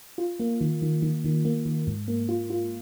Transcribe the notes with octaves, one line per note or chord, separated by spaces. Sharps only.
F4
A#3
D#3
D#3
D#3
D#3
A#3
D#3
G#2
A#3
F4
F4